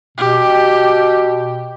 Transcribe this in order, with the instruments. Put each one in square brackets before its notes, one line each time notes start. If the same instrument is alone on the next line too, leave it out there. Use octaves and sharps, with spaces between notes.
[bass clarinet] B2 [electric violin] G4